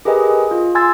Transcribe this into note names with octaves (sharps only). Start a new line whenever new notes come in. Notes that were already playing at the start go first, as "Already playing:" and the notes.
G4 G#4 A#4 B4 D#5 G#5
G#4
F4
G#5 C6 E6 G#6 A6